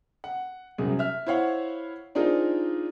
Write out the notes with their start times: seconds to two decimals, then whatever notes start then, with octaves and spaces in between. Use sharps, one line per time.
0.24 F#5
0.78 C2 F#2 G#4
0.99 E5 F6
1.27 E4 C5 C#5 F5 F#5
2.15 D4 D#4 F4 G#4 A#4 C5